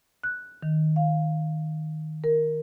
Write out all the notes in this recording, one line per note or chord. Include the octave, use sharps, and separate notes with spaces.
F#6
D#3
F5
A#4